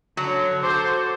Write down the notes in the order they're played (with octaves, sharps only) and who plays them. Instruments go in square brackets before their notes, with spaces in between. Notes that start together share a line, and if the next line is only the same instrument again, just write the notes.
[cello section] D3 C#5 [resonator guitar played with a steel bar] F#3
[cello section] F#4 A4 [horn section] C5 [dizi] D6